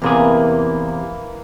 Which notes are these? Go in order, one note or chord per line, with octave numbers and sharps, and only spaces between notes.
E2 C3 E3 A#3 G#4